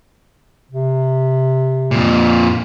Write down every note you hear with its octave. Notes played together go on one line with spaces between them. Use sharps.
C3
F2 A#2